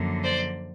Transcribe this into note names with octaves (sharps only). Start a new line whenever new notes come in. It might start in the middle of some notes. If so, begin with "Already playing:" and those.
Already playing: F#2 D3 F3 A#3
C5 D5